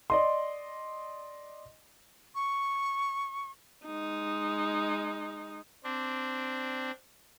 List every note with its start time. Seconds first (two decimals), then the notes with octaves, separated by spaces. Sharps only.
0.10 D5 D#5 C6
2.35 C#6
3.86 G#3 D#4
5.84 C4 D4